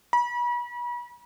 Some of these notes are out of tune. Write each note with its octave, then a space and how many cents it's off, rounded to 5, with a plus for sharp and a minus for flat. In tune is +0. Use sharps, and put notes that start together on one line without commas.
B5 -40